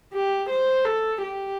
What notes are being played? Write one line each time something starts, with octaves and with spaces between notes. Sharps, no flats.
G4
C5
A4
G4